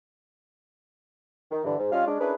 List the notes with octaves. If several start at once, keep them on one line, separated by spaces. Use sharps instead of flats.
D#3
G2 D3 E3
G#2
G3 C#4 F4 C#5 D#5 F5
G#3 C#4 D4
C#4 D4 E4 G#4 A#4 B4